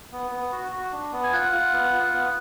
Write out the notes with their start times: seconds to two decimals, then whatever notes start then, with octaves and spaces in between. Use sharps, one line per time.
0.12 B3
0.31 B3
0.52 F#4
0.72 F#4
0.92 D4
1.12 B3
1.23 G#5
1.33 F4 F#5
1.52 F4
1.73 B3
1.93 F4
2.13 B3